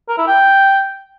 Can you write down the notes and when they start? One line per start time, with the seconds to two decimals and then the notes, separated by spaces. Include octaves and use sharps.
0.08 A#4
0.18 E4
0.27 G5